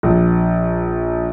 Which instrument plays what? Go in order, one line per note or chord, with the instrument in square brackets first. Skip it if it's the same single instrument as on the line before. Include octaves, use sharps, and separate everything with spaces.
[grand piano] A#1